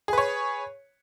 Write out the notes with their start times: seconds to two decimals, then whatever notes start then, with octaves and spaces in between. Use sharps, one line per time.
0.08 G#4
0.13 B4
0.18 C#5